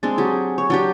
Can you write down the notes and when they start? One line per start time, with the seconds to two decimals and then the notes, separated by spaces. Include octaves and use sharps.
0.03 G#3 C4 D4
0.18 F#3 G4 G#4
0.58 C#5
0.70 F#3 D4 G4